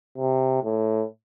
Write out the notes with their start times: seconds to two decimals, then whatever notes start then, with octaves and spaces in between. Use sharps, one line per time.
0.18 C3
0.63 A2